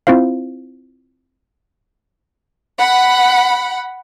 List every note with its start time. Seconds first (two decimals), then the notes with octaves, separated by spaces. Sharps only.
0.07 C4 E4 F4 C5 F5
2.79 F#5 B5